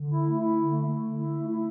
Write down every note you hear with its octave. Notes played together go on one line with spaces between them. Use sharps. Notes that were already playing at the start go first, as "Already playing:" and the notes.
Already playing: D3
E4
A3
E4
D3
A3
A3
D3
E4
A3
E4